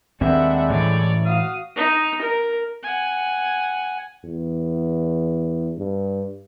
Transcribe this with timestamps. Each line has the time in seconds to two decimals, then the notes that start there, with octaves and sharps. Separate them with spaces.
0.21 D#2 G3 G#3 C4 D4 E5 F#5
0.70 A2 E3 C#5 D5
1.26 F#4 F5 D#6
1.76 D#4
2.21 A#4
2.83 F#5 G#5
4.25 E2
5.77 G2